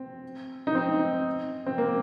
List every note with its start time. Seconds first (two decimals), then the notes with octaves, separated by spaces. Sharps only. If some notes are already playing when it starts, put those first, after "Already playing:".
Already playing: C4
0.67 D#4
0.75 C4
1.66 C4
1.78 A#3